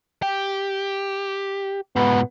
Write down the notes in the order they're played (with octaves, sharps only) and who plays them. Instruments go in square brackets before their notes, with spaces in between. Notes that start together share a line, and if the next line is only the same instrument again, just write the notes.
[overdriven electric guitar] G4
[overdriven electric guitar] G#2 B2 [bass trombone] B3